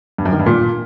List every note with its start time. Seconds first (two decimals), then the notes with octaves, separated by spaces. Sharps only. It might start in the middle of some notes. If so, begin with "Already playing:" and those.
0.18 G2
0.25 F#2
0.32 D#3
0.39 G2
0.46 A#2